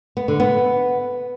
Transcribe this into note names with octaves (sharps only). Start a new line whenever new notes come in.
B3
D3
B3